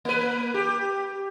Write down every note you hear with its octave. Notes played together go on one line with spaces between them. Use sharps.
A#3 B4
G4